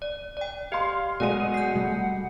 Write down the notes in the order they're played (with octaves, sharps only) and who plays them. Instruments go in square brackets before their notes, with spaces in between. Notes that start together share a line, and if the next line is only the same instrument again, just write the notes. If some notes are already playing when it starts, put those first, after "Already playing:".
[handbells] D5
D5 G5
[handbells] G4 D#5 [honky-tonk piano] F5 C6
[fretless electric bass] B2 [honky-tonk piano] F#3 G#3 D#7 [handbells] D5 [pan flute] F#5
[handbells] G6 C7
[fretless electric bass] B2 G3 A3